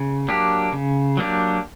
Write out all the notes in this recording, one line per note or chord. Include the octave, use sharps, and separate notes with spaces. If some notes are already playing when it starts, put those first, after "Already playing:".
Already playing: C#3
F#3 A#3 D4 G4
C#3
F#3 A#3 D4 G4